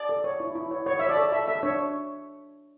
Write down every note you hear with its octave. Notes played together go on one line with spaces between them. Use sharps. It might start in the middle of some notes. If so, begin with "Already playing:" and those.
Already playing: D5
A4
C#5
E4
E4
C#5
C#5
C#5 E5
D5
A4
A4 E5
A4 E5
D4 C#5